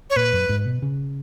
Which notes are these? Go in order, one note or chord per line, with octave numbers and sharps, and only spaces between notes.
C#5
A#2 B4
F#2
G#2
B2
C#3